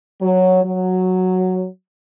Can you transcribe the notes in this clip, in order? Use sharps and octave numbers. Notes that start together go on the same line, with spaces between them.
F#3
F#3